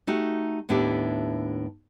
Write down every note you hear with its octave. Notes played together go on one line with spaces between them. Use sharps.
A3 D#4 F#4 G4
D#2 A2 B3 D4 E4 G4